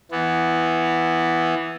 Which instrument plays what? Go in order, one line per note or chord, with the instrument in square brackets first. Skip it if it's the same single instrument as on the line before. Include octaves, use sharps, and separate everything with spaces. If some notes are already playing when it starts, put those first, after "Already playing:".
[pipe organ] E3 B3